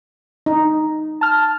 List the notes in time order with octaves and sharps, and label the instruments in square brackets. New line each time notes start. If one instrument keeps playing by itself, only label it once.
[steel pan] D#4
[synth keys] A5 F6